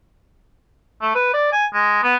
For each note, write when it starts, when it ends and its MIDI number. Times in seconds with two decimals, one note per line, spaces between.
1.02 1.13 57
1.15 1.30 71
1.34 1.51 74
1.52 1.66 80
1.74 2.02 56
2.03 2.16 59